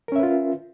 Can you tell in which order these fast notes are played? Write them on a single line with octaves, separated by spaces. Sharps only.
A#4 C#4 E5 B4 F4